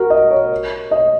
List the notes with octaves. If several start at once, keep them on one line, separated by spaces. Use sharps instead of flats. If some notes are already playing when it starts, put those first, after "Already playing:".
Already playing: F#4 A#4
D#5
C#5
D#5